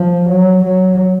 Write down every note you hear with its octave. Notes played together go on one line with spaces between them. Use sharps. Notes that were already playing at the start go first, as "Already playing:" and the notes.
Already playing: F3
F#3
F#3